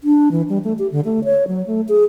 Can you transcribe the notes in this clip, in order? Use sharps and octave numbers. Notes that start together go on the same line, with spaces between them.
D4
E3
G3
A3
G4
D3
A3
C#5
F#3
A3
G#4